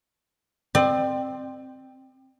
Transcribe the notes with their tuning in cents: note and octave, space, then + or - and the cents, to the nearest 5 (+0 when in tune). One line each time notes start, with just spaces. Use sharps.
C4 +0 D5 +40